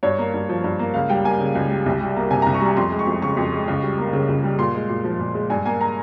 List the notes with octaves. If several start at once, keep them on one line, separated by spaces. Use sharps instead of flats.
G2 C#5
A#3
G2
F3
G2
A#3
C#2 F5
G3 G5
A#3 G#5
C#3
C#2
G3
C2
G3
A#3
C3 G#5
A#5
C2
C#6
G3 A#5
F2 C6
G#3
C#6
F2
C#3 C#6
F2
G#3
C#2
G3
A#3
C#3
C#2
G3
A#2 C6
G#3
A#2
F3
A#2
G#3
G2 G#5
A#3 G#5
A#5